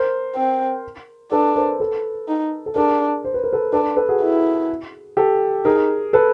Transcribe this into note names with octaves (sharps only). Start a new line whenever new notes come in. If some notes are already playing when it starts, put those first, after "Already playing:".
Already playing: A#4 C5
C4
D4 A4 B4
A#4 C5
A4 B4
D#4
A4
D4 G#4 A#4
C5
B4
A#4
A4 B4
D4 A4 B4
A4 B4
F#4 G#4
E4
G4 A4
D#4 G#4 A#4
A4 B4